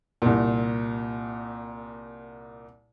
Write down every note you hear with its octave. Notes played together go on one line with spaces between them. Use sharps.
C2 A#2